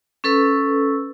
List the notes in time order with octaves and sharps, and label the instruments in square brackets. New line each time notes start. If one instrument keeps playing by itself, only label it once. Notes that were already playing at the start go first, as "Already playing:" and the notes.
[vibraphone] C#4 A4 B4 E6